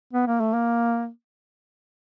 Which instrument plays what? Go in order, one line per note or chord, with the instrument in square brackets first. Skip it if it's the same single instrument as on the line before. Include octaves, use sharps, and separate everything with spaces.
[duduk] B3
A#3
A3
A#3